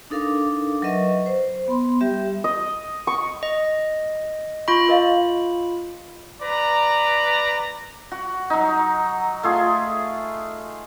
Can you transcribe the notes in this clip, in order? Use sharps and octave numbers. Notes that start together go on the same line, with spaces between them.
D4 D#4 A4 A#4 F5 D6
F#3 A#4 B4 D#5 E5 C#6
C5
B3 B5 C6
G3 G4 E5
D#5
C#6
D#5
F4 B5 C#6
A#4 D#5 F5
B4 D5 A#5
F#4
F#3 D#4
A3 F4 G#4